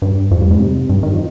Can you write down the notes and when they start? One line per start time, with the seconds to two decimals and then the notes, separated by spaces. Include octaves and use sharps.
0.02 G2
0.31 F2
0.41 G2
0.51 G#2
0.60 C3
0.89 G2
1.03 D#3
1.14 F3